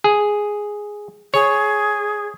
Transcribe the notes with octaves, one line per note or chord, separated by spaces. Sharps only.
G#4
G#4 C#5